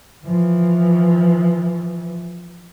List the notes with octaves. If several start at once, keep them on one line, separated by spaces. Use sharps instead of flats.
E3 F3